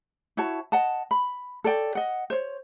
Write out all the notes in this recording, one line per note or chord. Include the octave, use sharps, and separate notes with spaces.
E4 F#4 C#5 A5
D#5 F#5 A5
B5
A4 C#5 D5 G5
D#5 F#5
C5 C#5